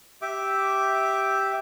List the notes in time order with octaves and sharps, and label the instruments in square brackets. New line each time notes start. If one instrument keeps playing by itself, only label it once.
[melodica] G4 E5 D6